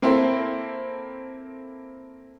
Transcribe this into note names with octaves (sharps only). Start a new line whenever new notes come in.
A#3 C4 E4 A4 A#4 C5